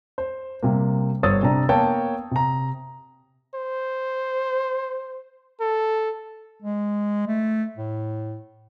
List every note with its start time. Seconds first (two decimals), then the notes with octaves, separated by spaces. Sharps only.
0.18 C5
0.62 C3 G3 A#3
1.23 G1 C5 C#5 D#6 E6 A6
1.43 C3 D4 A#5
1.69 A#3 B3 C#5 G5 A5
2.31 C3 A#5
3.55 C5
5.61 A4
6.62 G#3
7.27 A3
7.77 A2